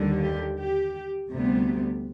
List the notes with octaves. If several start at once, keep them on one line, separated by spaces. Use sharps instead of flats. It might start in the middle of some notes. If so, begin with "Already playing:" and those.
Already playing: D#2 D3 G3
G4
G4
D2 C3 G3 B3